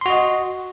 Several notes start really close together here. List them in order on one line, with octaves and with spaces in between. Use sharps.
C6 F#4 D#5